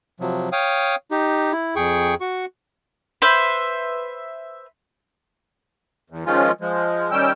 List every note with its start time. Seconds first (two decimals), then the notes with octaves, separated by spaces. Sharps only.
0.20 C3 F3 F#3
0.52 C#5 F5 G5 D#6
1.11 D#4 G4
1.52 E4
1.76 F2 G#4 G5 C#6
2.21 F#4 C#6
3.22 B4 C5 E5
6.10 E2
6.26 D#3 F3 G#3 C#4 F4
6.61 F3 G#3
7.11 D#3 G3 C#4 G5 E6